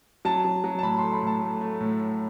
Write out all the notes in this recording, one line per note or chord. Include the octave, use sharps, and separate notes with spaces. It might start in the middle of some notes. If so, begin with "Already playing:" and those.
F#3 A5
F#3
F#3
A5
A2 B5
A3 C6
B5
A2 A5
A3
A3
A2